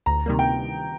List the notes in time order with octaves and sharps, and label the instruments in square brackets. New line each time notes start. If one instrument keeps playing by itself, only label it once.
[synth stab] D2 [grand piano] A#5
[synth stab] C3 D#3 G3 A#3
[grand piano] G5